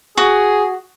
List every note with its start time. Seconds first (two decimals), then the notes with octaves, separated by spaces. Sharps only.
0.17 F#4 G#4